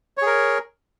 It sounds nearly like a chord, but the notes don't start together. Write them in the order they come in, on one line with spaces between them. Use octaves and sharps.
C#5 G#4 A#4